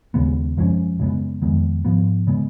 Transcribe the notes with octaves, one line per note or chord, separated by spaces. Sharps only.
D#2 C#3 G#3 B3
F#2 F3 G#3 C#4
F#2 C#3 G#3 B3
F2 D#3 G#3 B3
G#2 F3 B3
C#3 G#3 B3